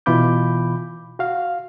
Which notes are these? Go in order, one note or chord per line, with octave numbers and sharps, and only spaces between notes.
B2 E3 F4 B5 D6 G6
F#4 F5